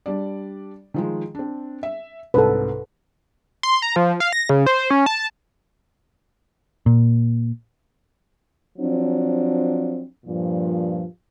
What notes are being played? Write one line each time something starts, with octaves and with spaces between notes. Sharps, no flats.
G3 D4 D5
D#3 F3 G#3
C4 D4
E5
C2 G#2 C3 A4 B4
C6
A#5
F3
F5
A#6
C#3
C5
C#4
A5
A#2
F3 F#3 C4 D4
G2 A#2 F3